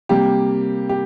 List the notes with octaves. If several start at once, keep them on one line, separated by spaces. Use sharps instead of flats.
C3 G3 A#3 G4
G4